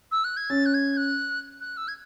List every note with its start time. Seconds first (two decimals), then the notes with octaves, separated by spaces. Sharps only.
0.12 E6
0.24 F#6
0.37 G#6
0.50 C#4 A6
0.66 F#6
0.74 G#6
0.97 F#6
1.60 F#6
1.77 E6
1.88 G#6